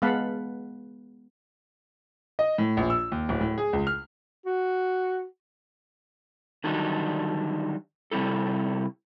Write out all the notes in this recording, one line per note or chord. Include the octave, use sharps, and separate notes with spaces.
G#3 B3 F5 F#5 A5 B5
D#5
A2
A#1
E6
D#2
D1
A2
G#4
C#2
F6
F#4
D3 D#3 F#3 G3 D4 D#4
C3 G3 C4 E4 A4